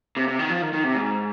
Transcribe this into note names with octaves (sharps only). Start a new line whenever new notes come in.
C3
C3
D#3
F3
D#3
D#3
C3
G#2